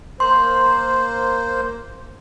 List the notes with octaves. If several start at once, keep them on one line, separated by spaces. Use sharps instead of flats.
A#3 C5 C6